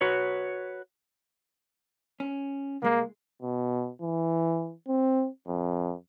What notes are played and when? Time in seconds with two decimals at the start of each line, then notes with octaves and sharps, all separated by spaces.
0.01 F#4 B4 C#5
2.20 C#4
2.82 C2 G#3 A#3
3.42 B2
4.01 E3
4.88 C4
5.47 F2